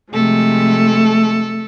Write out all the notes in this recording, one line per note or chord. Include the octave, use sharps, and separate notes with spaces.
C3 F3 G#3 A3 A4